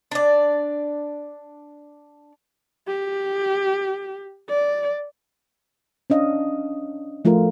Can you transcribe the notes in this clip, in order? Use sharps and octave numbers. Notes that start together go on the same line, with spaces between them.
D4 D5
G4
D5
C#4 D4 D#5 F5
F3 A3 F4 F#4 A#4